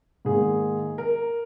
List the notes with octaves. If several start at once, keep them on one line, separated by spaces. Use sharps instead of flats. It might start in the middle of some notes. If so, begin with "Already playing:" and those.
G#2 D#3 A#3 G#4
A#4